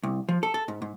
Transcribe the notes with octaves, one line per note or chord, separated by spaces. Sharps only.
C2
F3
A4
A4
G#2
G#2